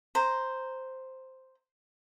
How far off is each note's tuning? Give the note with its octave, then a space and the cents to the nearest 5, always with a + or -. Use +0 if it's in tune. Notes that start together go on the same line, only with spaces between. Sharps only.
C5 +0 A#5 +0